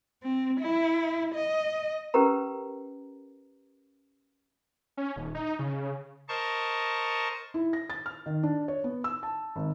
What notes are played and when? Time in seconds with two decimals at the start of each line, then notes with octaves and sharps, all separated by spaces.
0.23 C4
0.60 E4
1.34 D#5
2.14 C#4 G4 A#4 B4 A#5
4.97 C#4
5.16 D#1
5.35 D#4
5.59 C#3
6.29 A#4 C5 D#5 A5 C#6
7.54 E4
7.73 A#6
7.90 A6
8.06 F6
8.26 D#3
8.43 D4
8.68 C#5
8.84 B3
9.04 E6
9.23 A5
9.56 G#1